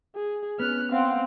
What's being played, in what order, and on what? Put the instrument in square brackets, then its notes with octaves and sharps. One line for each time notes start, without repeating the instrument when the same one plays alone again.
[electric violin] G#4
[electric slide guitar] B3 C#4 [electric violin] F6 F#6
[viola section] C4 [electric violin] F5 F#5